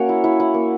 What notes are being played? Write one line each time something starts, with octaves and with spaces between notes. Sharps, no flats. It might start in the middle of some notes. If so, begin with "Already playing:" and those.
Already playing: A#3 C#4 F#4 C#5
E4
E4
E4
A#3